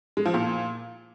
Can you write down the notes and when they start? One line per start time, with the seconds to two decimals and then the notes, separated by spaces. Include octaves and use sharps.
0.17 G#3
0.25 F3
0.34 A#2